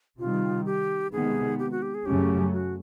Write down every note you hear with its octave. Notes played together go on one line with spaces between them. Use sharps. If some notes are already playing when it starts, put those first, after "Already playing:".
C3 D#3 G3 F4
G4
C3 D#3 G#3 B3 G#4
G4
F#4
G4
G#4
F#2 C#3 F#3 A3 C#4 G4
F#4